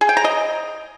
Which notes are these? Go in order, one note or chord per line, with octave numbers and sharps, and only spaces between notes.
G#4
G5
A#5
D#5